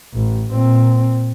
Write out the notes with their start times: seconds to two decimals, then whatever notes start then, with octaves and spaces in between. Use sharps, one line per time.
0.14 A1
0.52 A#2 C4